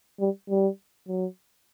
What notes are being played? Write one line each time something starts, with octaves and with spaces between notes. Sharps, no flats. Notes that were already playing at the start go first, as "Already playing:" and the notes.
G3
G3
F#3